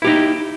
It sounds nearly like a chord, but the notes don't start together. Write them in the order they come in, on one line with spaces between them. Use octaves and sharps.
E4 G4 D#4